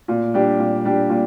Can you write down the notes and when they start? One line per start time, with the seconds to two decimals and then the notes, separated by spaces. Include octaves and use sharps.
0.08 A#2
0.34 G3 D4 G4
0.59 A#2
0.85 G3 D4 G4
1.10 A#2